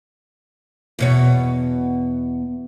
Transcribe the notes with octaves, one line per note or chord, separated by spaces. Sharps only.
E2 B2 C#5